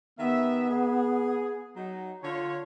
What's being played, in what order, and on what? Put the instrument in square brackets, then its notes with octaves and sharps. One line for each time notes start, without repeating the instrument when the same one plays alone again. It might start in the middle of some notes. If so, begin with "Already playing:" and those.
[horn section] D#3 G4 E5 [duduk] B3
[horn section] G#4
F#3 D#4
[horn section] D3 C#5 [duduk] F4